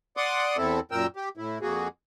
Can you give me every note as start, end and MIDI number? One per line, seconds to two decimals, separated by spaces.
0.17 0.57 74
0.17 0.57 78
0.17 0.57 84
0.17 0.57 86
0.17 0.57 87
0.57 0.80 40
0.57 0.80 60
0.57 0.80 64
0.57 0.80 69
0.91 1.07 42
0.91 1.07 46
0.91 1.07 70
0.91 1.07 79
0.91 1.07 88
1.16 1.29 67
1.37 1.59 45
1.37 1.59 64
1.62 1.88 41
1.62 1.88 58
1.62 1.88 66
1.62 1.88 68